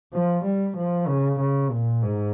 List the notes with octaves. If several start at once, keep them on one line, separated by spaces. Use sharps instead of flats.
F3
G3
F3
C#3
C#3
A#2
G#2